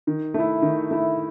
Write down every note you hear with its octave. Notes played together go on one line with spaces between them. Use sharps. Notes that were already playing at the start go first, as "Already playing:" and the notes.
D#3
A3 E4
D#3
A3 E4